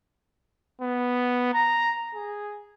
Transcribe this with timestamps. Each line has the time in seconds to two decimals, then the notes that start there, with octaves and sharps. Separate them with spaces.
0.82 B3
1.54 A#5
2.15 G#4